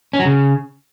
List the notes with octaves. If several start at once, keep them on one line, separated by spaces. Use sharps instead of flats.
C#4
F#3
C#3